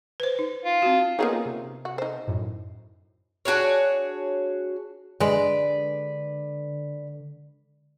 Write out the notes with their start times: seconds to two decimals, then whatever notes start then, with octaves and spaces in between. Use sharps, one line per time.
0.20 B4 C5
0.39 D#4
0.65 F4
0.82 C4 F#4
1.19 A#3 B3 C#4 D#4 F4 G#4
1.45 C3
1.85 F#4
1.98 D#4 C5
2.28 F#2 A2
3.45 D4 F#4 G#4 C#5
5.20 D3 G#3 B4 D5